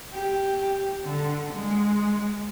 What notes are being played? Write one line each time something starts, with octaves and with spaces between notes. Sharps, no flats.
G4
D3
G#3